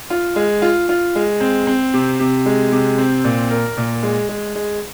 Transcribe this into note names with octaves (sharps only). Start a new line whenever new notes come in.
F4
G#3
F4
F4
G#3
C4
C4
C3
C3
G#3
C3
C4
A#2
A#4
A#2
G#3
G#3
G#3